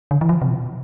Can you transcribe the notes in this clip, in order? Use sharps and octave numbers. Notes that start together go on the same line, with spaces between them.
D3
E3
F3
C3
B2